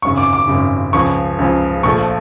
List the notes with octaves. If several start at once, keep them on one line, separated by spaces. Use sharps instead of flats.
G#1 F#2 C#3 C#6
D6
D6
G#1 F#2 C#3
C#2 C#3 F3 C#6
C#2 C#3 F3
A#1 A#2 F3 A3 C#6